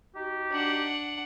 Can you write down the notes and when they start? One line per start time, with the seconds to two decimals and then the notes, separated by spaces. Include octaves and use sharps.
0.15 D#4 F#4 G4
0.51 D4 F#5